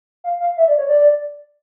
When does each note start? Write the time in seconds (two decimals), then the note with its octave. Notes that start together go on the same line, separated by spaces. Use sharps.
0.24 F5
0.40 F5
0.57 E5
0.68 D5
0.78 C#5
0.88 D5